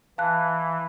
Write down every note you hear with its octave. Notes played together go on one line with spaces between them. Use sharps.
E3 F5 A5 F#6